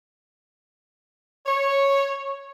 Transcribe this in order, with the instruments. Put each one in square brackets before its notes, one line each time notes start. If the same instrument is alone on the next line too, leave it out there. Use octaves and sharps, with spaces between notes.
[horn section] C#5